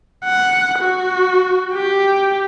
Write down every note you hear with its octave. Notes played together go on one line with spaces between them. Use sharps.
F#5
F#4
G4